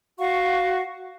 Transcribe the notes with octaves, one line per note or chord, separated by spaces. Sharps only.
F#4 F5 F#5 C#6